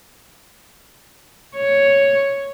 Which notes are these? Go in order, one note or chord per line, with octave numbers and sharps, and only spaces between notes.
C#5